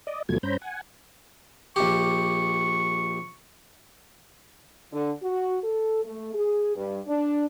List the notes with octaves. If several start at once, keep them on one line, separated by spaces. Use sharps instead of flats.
D5 D#5
D#2 B2 F3 F#3 A3 G#6
G2 C#4 C5 A#5 B5 G6
F#5 G#5
A#1 G4 C#6
D3
F#4
A4
A3
G#4
G2
D4